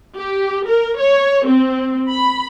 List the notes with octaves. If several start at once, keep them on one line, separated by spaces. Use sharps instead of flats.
G4
A#4
C#5
C4
B5